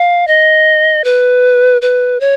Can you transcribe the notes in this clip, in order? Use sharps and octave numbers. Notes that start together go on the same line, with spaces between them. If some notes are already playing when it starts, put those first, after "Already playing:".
Already playing: F5
D#5
B4
B4
C#5